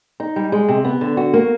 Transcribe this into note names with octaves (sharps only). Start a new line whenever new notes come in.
D#4
G3
G#3
C3
B3
D3
F#4
A#3